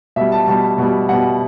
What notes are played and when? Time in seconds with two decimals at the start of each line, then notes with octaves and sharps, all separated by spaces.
0.16 B2 G3 E5
0.32 A5
0.48 B2 G3 A5
0.78 B2 G3
1.09 B2 G3 F#5